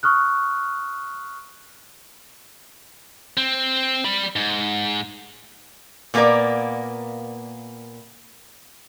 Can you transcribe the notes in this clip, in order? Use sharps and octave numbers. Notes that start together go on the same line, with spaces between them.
C#6 D#6 F6 F#6
C4
D5 B5
G#2
A#2 A#3 B3 D#4 A#4 D5